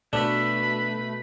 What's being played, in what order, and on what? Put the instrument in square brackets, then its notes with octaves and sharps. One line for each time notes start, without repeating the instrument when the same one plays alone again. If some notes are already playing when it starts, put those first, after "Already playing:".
[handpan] B2 [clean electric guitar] A3 [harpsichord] D4 [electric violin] B4 B5